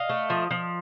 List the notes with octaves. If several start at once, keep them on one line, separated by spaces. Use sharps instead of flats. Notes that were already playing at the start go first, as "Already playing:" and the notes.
Already playing: D#5 F5
A3
F3
F3